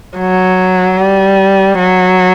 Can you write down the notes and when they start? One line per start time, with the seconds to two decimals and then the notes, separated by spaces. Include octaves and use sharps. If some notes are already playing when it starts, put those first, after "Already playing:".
0.18 F#3
0.98 G3
1.79 F#3